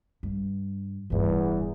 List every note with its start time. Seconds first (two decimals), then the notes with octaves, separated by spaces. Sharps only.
0.23 G2
1.10 D1 E2 G2